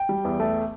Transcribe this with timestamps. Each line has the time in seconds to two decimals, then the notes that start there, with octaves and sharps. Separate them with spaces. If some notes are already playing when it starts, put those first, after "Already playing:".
Already playing: G5
0.09 G3
0.25 E2
0.40 A3